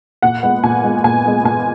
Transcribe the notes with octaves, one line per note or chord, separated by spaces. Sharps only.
A#2 F#5
G#3 B3
A#2 G#5
G#3 B3
A#2 G#5
G#3 B3
A#2 G#5